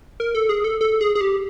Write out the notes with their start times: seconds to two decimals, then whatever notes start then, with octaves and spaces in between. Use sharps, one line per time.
0.20 A#4
0.35 A4
0.49 G#4
0.64 A4
0.81 A4
1.01 G#4
1.15 G#4
1.21 G4